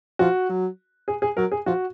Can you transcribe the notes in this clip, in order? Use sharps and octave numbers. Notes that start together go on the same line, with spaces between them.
F3 F#4
F#3
G#4
G#4
F#3 A#4
G#4
F3 F#4